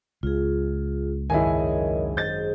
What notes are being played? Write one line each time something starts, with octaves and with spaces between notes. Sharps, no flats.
C#2 F4 G#4
G#1 F#2 E4 G#4 A#4 C#5 D#5 G#5
G#4 C5 D#5 G6 A6